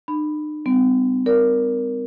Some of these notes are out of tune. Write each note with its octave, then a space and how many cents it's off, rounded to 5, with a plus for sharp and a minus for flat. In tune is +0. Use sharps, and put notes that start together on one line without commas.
D#4 -45 B5 +5
G3 +5 C4 -45
A#4 +0 D5 -25